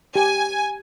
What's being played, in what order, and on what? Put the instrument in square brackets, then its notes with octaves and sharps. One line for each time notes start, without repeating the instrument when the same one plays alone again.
[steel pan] G4 [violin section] G#5